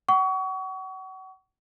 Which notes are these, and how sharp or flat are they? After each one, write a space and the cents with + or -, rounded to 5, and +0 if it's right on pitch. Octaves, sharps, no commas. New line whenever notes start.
F#5 +35 C#6 +30